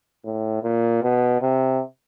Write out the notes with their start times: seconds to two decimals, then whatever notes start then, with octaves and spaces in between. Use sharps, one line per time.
0.25 A2
0.63 A#2
1.02 B2
1.41 C3